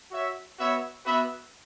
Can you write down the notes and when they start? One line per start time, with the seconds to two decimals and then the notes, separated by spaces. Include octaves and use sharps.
0.11 F#4 C#5 E5
0.58 B3 F#4 C#5 E5
1.05 B3 F#4 B4 E5